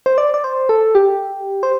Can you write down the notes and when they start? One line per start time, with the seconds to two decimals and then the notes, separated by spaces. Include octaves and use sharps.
0.06 C5
0.18 D5
0.34 D5
0.44 C5
0.69 A4
0.95 G4
1.63 C5